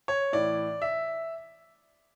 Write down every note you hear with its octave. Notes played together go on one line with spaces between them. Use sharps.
C#5
A2 E3 D5
E5